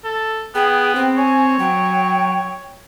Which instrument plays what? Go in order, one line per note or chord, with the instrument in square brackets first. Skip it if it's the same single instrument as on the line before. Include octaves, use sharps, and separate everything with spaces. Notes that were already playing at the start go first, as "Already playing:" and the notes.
[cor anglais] A4
[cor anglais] B3 [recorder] G#4 [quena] G5
[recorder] C4
[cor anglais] C#5 [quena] G#5
[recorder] F#3 [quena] G5